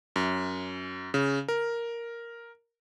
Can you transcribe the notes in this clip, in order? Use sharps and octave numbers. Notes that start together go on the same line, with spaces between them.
F#2
C#3
A#4